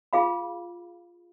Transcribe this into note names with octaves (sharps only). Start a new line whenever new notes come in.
F4 G#4 F5 B5